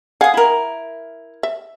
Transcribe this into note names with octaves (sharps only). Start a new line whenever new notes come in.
G#4 F5 F#5 D#6
E4 A#4
E5